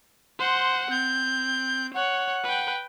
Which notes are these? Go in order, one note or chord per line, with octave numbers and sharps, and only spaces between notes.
C5 F#5 C6
C4 G6
C#5 F#5
B4 G5